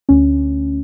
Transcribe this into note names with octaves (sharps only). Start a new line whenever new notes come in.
D2 C#4